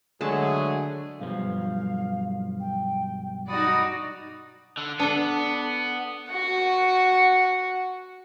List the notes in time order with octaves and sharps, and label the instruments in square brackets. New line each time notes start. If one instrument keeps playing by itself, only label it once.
[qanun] D3 A5 [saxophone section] F#3 A3 [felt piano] G#3 [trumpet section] G#4
[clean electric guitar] B1 G2 F3 [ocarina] F5
[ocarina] G5
[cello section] D#4 F#4 D5 [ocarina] B5 [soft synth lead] D#6
[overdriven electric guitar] D3
[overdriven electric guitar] B3 [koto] D4 A4
[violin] F#4 F#5